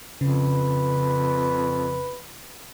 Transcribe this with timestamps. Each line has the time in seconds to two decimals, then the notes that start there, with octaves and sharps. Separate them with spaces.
0.21 F2 C#3 B4